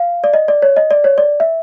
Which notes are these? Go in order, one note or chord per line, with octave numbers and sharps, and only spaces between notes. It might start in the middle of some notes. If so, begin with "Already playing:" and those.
Already playing: F5
D5
D#5
D5
C#5
D#5
D5
C#5
D5
E5